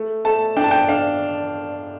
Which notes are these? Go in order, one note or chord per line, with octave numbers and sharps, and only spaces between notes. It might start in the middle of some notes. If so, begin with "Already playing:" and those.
Already playing: A3
A3 A5
D4 G5
A5
G5
D4 F5